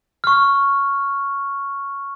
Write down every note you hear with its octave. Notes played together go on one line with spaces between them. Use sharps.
C#6 F6